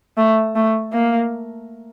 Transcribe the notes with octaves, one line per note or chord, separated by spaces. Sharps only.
A3
A3
A#3